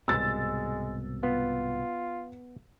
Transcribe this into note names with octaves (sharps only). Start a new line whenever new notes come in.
C2 G#2 B2 G#3 E6 A6
B3 F4